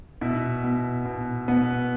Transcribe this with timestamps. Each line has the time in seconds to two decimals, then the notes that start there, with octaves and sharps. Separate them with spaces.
0.21 B2 E4
0.64 B2
1.06 B2
1.48 B2 B3